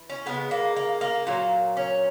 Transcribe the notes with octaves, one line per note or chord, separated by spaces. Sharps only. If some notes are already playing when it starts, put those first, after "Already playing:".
Already playing: E3
C#4
C#3 G#3 B3
A#3
A#3
A#3
A#2 F#3 A#3
C#4